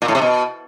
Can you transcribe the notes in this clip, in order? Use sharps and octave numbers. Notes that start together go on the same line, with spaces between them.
A#2
A2
C3
B2